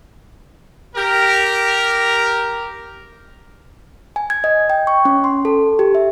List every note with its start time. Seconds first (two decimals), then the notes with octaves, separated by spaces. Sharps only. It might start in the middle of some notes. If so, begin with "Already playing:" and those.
0.96 G4 A#4
4.16 G#5
4.30 G#6
4.44 D#5
4.70 G5
4.87 C#6
5.05 C#4
5.24 C6
5.45 A4
5.79 G4
5.95 E5